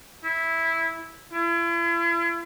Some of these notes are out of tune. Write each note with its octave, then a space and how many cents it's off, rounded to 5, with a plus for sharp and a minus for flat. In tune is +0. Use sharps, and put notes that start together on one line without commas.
E4 -5
E4 +40